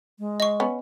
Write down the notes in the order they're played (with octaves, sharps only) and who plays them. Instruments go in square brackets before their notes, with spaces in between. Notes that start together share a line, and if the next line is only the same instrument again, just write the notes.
[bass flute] G#3
[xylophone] D#5 C#6
[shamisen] B3 C#4